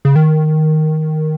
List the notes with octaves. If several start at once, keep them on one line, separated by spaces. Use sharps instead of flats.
C#3
D#3